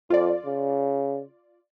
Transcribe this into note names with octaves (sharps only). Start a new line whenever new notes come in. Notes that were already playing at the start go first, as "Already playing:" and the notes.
F2 F4 D5
C#3